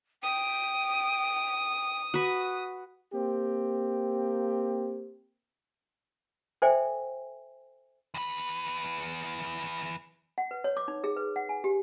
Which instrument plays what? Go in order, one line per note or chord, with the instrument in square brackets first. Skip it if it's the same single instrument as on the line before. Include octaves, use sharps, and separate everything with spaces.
[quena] G5 [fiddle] D#6
[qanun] F#4 B4
[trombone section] A#3 C4 G4
[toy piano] A4 C5 D5 E5 G5 G#5
[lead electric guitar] E2 B4
[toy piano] F#5
B4
C#5
D6
D#4
G#4
B4
F#5
G#5
G4